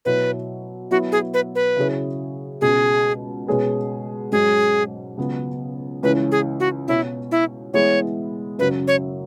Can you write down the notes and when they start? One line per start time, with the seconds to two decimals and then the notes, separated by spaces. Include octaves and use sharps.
0.05 B2 F#3 E4 B4 C#5
0.91 F#3 B3 E4 F#4
1.12 G#4
1.34 B4
1.55 B4
1.76 C#3 F#3 E4 G#4 C#5
2.61 C#2 B2 G#3 G#4
3.47 B2 G#3 C#4 G#4 B4
4.32 G#2 F#3 C#4 G#4
5.17 C#2 C#3 F#3 B3
6.03 C#2 C#3 E3 C#4 B4
6.32 G#4
6.60 F#4
6.88 B2 B3 E4 F#4 C#5
7.31 E4
7.74 E3 G#3 B3 E4 G#4 C#5
8.58 F#2 C#3 F#3 B4
8.88 C#5